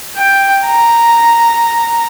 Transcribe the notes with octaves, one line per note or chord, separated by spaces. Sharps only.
G5
A#5